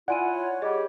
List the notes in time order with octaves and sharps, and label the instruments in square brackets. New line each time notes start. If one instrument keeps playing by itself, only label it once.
[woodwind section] E4 F4 [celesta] D5 G#5 D#7 [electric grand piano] F#5
[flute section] C#5
[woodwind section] G3 G4 [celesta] G#4 D#5